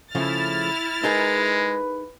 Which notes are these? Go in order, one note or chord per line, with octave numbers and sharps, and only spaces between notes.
C#3 F3 A3 E4 F6 A6
G#3 D#4 G#4 A#4 B4